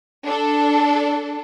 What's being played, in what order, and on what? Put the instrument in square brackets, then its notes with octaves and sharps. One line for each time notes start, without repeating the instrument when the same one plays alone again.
[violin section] D4 A4